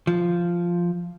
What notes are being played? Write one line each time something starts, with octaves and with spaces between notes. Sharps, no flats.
F3